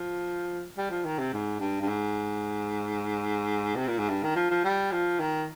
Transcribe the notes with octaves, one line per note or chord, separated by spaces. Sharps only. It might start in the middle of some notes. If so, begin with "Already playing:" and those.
Already playing: F3
G3
F3
D#3
C3
G#2
G2
G2
G#2
C3
A#2
G#2
G2
D#3
F3
F3
G3
F3
D#3